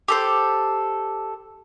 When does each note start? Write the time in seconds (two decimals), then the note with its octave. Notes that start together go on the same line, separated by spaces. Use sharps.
0.08 G4 A4 C5